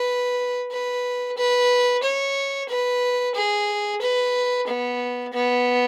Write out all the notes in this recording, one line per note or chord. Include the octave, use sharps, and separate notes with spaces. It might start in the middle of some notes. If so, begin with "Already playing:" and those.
Already playing: B4
B4
B4
C#5
B4
G#4
B4
B3
B3